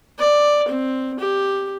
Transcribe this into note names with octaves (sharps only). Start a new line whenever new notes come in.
D5
C4
G4